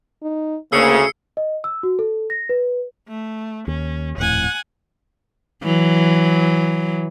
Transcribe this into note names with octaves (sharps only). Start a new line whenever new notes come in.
D#4
D2 C#3 A#3 G#4 E6 C7 C#7
D#5
E6
F#4
A4
A#6
B4
A3
D#2 C#4
D#1 F2 A2 F#5 G#5
E3 F#3